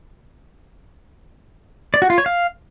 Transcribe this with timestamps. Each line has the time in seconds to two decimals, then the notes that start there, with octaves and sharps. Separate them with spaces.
1.94 D5
2.02 F#4
2.10 F4
2.18 C#5
2.26 F5